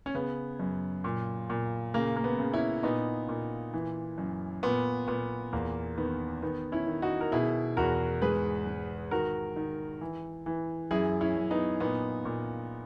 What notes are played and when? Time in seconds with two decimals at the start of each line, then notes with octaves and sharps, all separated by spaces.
0.06 C#4
0.15 C#3 B3
0.59 F#2
1.04 A#2
1.50 A#2
1.94 C#3 A#3
2.16 A#3
2.24 B3
2.39 C#3
2.54 C#4 E4
2.83 A#2 B3 D#4
3.29 A#2
3.73 E3
4.18 F#2
4.63 A#2 B3
5.08 A#2 B3
5.53 E2 A#3
5.98 D#3 B3
6.42 D#3 B3
6.72 C#4 E4
6.87 D#3
7.02 D#4 F#4
7.21 A#4
7.32 B2 E4 G#4
7.77 E2 F#4 A#4
8.22 G#2 G#4 B4
8.67 G#2
9.11 D#3 F#4 A#4
9.56 D#3
10.01 E3
10.46 E3
10.91 F#2 E4 G#4
11.21 C#4 E4
11.36 F#2
11.51 B3 D#4
11.80 A#2 B3 D#4
12.25 A#2